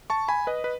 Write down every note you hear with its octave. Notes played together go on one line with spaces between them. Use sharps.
A5 C#6
G#5 B5
B4 D#5
B4